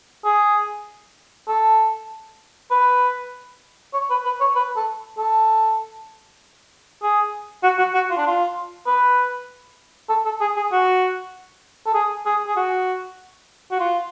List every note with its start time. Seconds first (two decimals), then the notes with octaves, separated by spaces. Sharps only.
0.25 G#4
1.48 A4
2.71 B4
3.94 C#5
4.10 B4
4.25 B4
4.40 C#5
4.55 B4
4.76 A4
5.18 A4
7.02 G#4
7.63 F#4
7.79 F#4
7.94 F#4
8.10 F4
8.17 D4
8.27 F4
8.86 B4
10.09 A4
10.25 A4
10.41 G#4
10.56 G#4
10.72 F#4
11.86 A4
11.94 G#4
12.26 G#4
12.47 G#4
12.56 F#4
13.71 F#4
13.80 F4